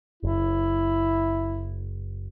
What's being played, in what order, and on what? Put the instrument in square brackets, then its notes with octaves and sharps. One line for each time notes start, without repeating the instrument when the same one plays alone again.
[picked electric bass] F#1 [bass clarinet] E4